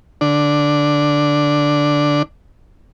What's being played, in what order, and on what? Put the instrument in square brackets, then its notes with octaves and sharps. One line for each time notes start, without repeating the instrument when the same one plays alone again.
[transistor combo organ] D3 D4